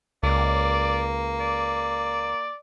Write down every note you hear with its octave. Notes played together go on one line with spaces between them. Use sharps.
C#2 A#3 D5
D5